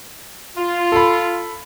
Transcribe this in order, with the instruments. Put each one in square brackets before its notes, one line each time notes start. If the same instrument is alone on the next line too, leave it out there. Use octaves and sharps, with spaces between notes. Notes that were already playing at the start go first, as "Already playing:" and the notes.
[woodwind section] F4
[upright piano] A4 B5